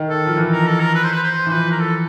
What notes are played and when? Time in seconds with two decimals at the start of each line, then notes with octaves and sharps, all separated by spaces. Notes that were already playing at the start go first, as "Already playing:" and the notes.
Already playing: D#3
0.10 A4
0.26 F3
0.37 E3
0.52 A#4
0.67 A4
0.80 A#4
0.95 B4
1.03 C5
1.12 B4
1.23 C5
1.47 E3
1.51 F3 B4
1.71 A#4
1.80 A4